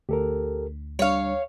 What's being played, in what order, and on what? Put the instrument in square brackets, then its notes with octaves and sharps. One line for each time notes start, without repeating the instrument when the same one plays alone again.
[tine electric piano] D2 [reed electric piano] G4 A4 A#4
[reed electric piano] G3 D4 [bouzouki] C#5 F5